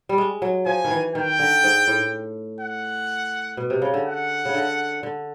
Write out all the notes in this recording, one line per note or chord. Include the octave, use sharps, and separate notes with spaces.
G3
G#3
F#3
F3 G#5
D#3
E3
D#3 G5
D3
G#2
A2
F#5
B2
C3
C#3
D3
F#5
C#3
D3
D3